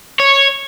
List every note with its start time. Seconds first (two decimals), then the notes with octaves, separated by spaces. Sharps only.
0.20 C#5